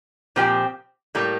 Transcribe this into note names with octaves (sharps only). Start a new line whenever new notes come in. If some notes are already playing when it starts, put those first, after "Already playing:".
A#2 F3 C4 G4
A2 G3 A#3